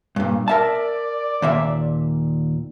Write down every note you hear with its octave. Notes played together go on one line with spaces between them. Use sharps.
G2 A#2
A#4 D5 E5 A5
D#2 A#2 E5